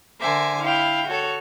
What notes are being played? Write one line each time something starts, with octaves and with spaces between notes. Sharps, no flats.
D3 A#4 C5 E5 G#5 D6
E4 F5 G5
F#4 A4 C#5